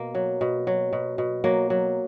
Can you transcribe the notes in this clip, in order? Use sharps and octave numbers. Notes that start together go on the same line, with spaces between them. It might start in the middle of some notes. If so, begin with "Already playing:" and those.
Already playing: B2 A#3
F#3
B2
F#3
B2
B2
F#3 A#3
F#3